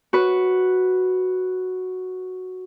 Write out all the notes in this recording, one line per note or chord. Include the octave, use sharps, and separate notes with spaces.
F#4 B4